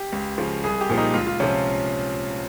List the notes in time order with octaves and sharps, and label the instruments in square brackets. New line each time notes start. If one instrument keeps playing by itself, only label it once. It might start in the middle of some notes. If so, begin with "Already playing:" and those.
Already playing: [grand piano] G4
C#2
C#3 F3
C2 G#4
G4
A#2 F3
D#4
C#2 F4
F4
C3 F3 C#4